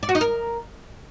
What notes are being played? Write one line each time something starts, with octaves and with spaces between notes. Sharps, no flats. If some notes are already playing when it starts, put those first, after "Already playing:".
D5
F#4
D#4
A#4